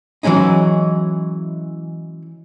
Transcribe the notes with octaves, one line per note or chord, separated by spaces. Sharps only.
E3 F#3 G#3 C#4 D#4